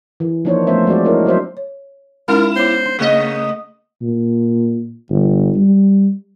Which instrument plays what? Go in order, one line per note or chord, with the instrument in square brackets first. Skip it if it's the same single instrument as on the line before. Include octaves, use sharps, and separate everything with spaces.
[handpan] E3
F3 A#3 D4 D#4 C5 C#5
F3 A3 B3 C#4 C5 E5
F3 G#3 C4 F#4 D5
D4 E4 A#4 C#5
F#3 D4 C5 E5
[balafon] C#5
[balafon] G#3 C#4 D#4 [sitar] E4 [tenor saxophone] A#4
[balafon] B3 C#5 D6 [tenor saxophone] C5
[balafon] D4 C6
[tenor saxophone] C#3 [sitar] A3 D#5 [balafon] A#3
[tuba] A#2
G1
G3